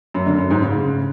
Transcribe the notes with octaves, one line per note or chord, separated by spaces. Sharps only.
F#2
D3
F#2
G#2
C#3